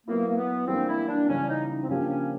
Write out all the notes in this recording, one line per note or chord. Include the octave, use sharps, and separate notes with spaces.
F#3 A#3 B3 E4
A#3
B3
E3 G3 A#3 C4 D4
E4
D4
C#3 E3 G3 C#4
D4
D#4
D#4
C4
C#3 F3 A#3 C#4 D4 G4
C#4